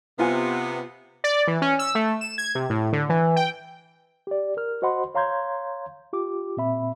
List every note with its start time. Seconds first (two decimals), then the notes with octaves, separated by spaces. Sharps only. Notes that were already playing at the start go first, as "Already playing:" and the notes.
0.19 C3 B3 F4 F5 G#5
1.24 D5
1.47 E3
1.62 C#4
1.79 E6
1.95 A3
2.21 E7
2.38 G#6
2.55 C3
2.70 A2
2.93 D3
3.09 E3
3.36 G5
4.27 G4 D5
4.57 A#4 F6
4.82 F#4 C5 D#5 F#5 B5 C6
5.15 C#5 F5 A#5 C6 G6 G#6
6.13 F4 G4 D6
6.57 A#2 C4 E5 B5